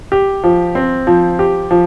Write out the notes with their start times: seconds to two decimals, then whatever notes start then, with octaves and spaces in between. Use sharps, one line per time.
0.12 G4
0.44 F3
0.75 C4
1.07 F3
1.39 G4
1.71 F3